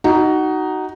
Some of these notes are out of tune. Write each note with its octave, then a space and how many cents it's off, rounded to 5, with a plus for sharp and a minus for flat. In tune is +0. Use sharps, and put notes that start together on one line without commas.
D#4 +0 F#4 +20